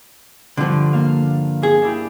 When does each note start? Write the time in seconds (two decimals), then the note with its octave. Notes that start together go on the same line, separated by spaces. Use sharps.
0.57 G2 D3 F3 D4
0.93 A#3 F5
1.63 G#4
1.82 D4 E4 G4